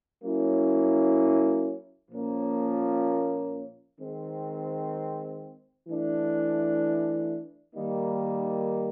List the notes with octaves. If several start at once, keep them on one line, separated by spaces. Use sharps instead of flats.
F#3 A#3 C#4 E4
A#2 F3 A#3 C#4
D#3 G#3 C4
E3 A3 D4
D#3 G3 A#3 D#4